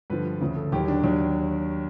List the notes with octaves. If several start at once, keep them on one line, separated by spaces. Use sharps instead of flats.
G2 D3 F3 B4
D2 C#3 F3
A4
D#2 D#3 F#3 G4
D4
D#2 D#3 F#3 D4